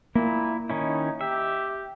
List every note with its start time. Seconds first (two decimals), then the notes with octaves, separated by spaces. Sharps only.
0.15 A#2 A#3 E4
0.70 D#3 C#4 D#4 E4
1.21 G4 E5